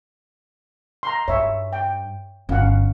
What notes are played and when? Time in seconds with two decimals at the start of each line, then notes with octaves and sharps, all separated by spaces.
1.03 A#5 C6
1.28 G2 C#5 E5
1.73 G5
2.49 G1 C#4 F5 F#5